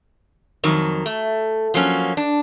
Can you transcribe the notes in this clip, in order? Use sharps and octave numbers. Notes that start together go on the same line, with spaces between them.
F2 D#3 F#3
A3
F3 F#3 A#3 C#4
D4